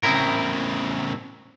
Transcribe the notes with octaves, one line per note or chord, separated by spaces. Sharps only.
A2 C#3 C4 E4 A#4